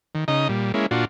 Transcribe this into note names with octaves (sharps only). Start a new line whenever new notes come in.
D#3
C#3 D#4 D#5 A#5
A#2 G3
G#3 A#3 C#4 E4
A#2 D4 F4 F#4